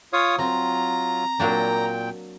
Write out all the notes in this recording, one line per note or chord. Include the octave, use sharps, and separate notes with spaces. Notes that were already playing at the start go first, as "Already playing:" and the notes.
F4 C#5 F5 D#6
F#3 C4 F4 A#5
A#2 F#3 A#3 D4 G5